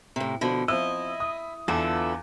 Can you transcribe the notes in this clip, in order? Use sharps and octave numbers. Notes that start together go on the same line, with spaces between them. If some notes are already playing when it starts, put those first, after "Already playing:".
A2 C3
B2 D3 F3
F3 C4 E4 D#5 E6
D#6
E2 D3 B3 F4 A4 E5